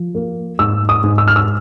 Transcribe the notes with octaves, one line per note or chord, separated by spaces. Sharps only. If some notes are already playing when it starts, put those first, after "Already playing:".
Already playing: F3
A#3
G#2 E6
D#6
G#2
E6
F6
E6